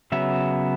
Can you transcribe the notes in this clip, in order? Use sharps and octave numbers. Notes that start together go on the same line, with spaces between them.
C#3 F#3 B3 E5